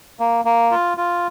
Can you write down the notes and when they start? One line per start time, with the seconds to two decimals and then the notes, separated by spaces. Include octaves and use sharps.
0.20 A#3
0.45 A#3
0.71 F4
0.98 F4